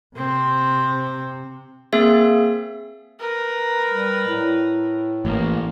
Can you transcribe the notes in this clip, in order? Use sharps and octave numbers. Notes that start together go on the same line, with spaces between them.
C3 C4
A#3 C4 G#4 E5 F5
A#4 B4
G3
A2
A1 A#3